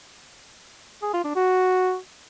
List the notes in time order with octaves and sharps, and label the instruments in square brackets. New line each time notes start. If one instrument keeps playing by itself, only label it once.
[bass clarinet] G#4
F4
D4
F#4